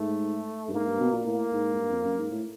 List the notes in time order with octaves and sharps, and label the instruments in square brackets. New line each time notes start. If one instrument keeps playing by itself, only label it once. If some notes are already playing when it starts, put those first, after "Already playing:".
Already playing: [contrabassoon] G#2 [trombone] A3
[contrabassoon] G2
[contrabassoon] G#2 [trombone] A#3
[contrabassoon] G2
B2
A#2
[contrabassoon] A2 [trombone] A#3
[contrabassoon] G#2
G#2
G2
F2
F#2
G#2
A2